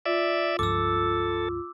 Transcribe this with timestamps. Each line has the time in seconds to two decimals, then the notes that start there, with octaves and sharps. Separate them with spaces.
0.06 F4 D5 E5
0.59 C#2 G2 F3 A4 D6 E6